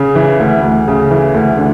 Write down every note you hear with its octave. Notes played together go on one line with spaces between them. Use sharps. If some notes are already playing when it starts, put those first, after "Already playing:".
Already playing: C#3
E3
D2
D2
C#3
E3
D2
D3